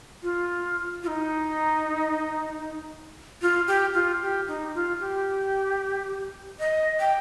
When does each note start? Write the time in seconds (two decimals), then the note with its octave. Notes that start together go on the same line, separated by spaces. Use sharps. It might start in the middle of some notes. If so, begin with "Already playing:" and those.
0.22 F4
1.03 F4
1.07 D#4
3.42 F4
3.67 G4
3.94 F4
4.22 G4
4.48 D#4
4.74 F4
5.00 G4
6.60 D#5
7.00 G5